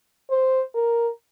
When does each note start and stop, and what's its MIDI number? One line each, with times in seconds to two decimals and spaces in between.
0.30 0.63 72
0.75 1.09 70